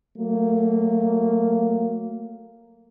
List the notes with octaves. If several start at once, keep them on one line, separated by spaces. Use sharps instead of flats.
F#3 A3 A#3